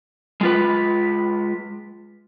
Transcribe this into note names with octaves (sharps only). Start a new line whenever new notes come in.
G#3 F4 B4